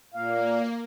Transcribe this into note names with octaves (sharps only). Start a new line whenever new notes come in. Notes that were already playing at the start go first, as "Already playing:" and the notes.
A#2 A#3 F5